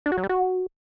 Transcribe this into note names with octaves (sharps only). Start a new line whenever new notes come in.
D4
F#4
F#3
G3
F#4